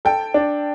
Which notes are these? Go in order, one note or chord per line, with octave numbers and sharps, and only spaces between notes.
A4 G5
D4